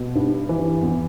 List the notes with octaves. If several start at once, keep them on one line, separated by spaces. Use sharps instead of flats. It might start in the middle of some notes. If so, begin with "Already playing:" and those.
Already playing: B2
G2
E3
E2